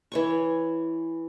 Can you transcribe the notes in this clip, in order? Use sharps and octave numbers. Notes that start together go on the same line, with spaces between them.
E3 C#5 C#6